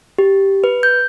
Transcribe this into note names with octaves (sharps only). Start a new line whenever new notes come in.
G4
B4
G6